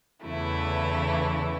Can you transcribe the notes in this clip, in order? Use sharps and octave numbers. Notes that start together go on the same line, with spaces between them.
E2 C#3 E3 A3 E4